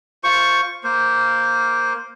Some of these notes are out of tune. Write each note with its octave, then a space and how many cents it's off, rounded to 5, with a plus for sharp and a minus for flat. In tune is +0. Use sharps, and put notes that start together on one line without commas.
F4 +0 C5 +0 C#6 +0
A#3 +0 C5 +0